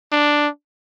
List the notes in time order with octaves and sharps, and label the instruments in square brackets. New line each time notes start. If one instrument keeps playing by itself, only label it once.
[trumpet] D4